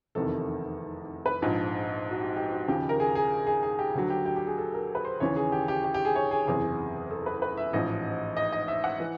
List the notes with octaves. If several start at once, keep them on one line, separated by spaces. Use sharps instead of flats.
F1 E2 C3 D#3 A4
B4
A#1 G#2 F3
F#4
G4
G4
F#4
D#2 C#3 F3 G4
A#4
G#4
G#4
G#4
G#4
G4
D2 D3 F#3
G4
G4
G4
G#4
A4
A#4
B4
C5
D#2 C#3 E3 C#5
G#4
G4
G4
G4
G4
G#4
C#5
G#4
F#1 E2 C3 G#4
A4
B4
B4
E5
A1 G#2 F3 D#5
D#5
D#5
E5
F#5
E3